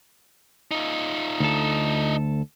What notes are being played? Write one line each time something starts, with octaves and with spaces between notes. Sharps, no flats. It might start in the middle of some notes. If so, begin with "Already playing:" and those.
D#4 F4
D2 A4